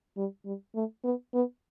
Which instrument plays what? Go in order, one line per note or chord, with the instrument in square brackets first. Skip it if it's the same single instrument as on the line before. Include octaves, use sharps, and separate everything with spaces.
[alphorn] G3
G3
A3
B3
B3